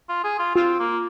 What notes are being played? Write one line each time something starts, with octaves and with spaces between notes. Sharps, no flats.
F4
G#4
F4
C4 F4
A#3